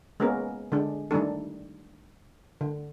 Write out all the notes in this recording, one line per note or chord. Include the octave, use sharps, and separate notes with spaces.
G#3 A#3 B3 C#4 A#4
D3 G#3 D4
D#3 G3 A3 D4 A4
D3